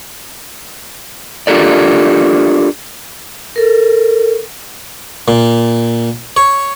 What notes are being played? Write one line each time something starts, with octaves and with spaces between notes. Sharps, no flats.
D4 F4 G4 A4 A#4 D5
A4 A#4
A#2
C#5